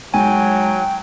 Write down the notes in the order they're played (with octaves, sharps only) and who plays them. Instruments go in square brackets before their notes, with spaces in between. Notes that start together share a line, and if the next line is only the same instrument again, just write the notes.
[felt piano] G#2 [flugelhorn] F#3 [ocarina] G5 [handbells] G#5